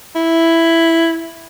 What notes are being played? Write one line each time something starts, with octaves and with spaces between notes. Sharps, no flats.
E4